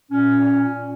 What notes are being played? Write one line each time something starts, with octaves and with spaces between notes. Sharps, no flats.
A#2 C#4
A#2
A#2